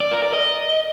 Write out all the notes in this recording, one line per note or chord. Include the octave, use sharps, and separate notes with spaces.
D5
A#4
D5
D#5